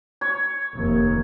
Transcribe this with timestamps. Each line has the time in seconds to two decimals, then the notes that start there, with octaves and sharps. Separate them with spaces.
0.21 C#5
0.74 F1 D#2